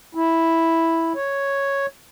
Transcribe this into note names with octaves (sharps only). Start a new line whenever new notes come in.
E4
C#5